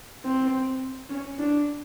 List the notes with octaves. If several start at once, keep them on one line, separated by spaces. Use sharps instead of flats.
C4
C#4
D4